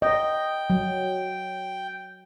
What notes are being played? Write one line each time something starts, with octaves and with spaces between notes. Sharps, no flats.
D#5 G5
F#3